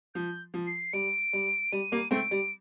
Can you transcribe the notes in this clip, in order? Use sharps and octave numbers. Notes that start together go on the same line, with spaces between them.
F3 G6
F3
C7
G3 D7
G3
G3 D#7
G3 A#3
A3 C4 D7
G3